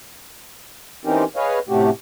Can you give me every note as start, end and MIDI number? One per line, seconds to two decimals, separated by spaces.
1.05 1.24 52
1.05 1.24 60
1.05 1.24 61
1.05 1.24 63
1.05 1.24 67
1.05 1.24 70
1.36 1.59 68
1.36 1.59 71
1.36 1.59 73
1.36 1.59 75
1.36 1.59 77
1.69 1.90 45
1.69 1.90 48
1.69 1.90 57
1.69 1.90 61
1.69 1.90 66
1.69 1.90 67